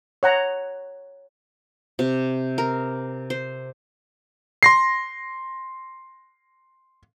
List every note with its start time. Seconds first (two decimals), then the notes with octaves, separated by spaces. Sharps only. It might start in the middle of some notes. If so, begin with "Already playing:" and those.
0.23 C#5 F#5 A#5
1.99 C3
2.58 A#4
3.30 C5
4.63 C6 A#6 C7